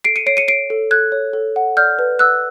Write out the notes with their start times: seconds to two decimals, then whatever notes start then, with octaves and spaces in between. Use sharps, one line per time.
0.04 A4 C7 D7
0.16 C#7 D#7
0.26 C#5 C7 D7
0.37 C#7 D#7
0.48 C#5 C7 D7
0.70 A4
0.91 A4 F#6 G#6
1.12 C#5
1.33 A4
1.56 F#5
1.77 D5 F6 G6
1.99 B4
2.19 F#5 E6 F#6